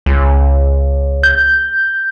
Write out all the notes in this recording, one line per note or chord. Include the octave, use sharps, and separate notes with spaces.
C#2
G6